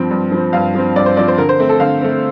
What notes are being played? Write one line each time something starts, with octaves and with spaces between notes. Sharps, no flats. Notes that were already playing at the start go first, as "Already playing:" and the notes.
Already playing: G2 F3 C4
G2
F3
C4
G2 F5
F3 C4
G2 D5
C5
F3 C4 D5
C5
D3 A#4
C5
A3 C4
A4
D3 F5
A3 C4